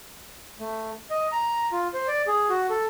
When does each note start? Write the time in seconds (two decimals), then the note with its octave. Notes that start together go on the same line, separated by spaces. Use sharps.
0.59 A3
1.10 D#5
1.32 A#5
1.72 F4
1.94 C5
2.08 D5
2.27 G#4
2.50 F#4
2.70 A4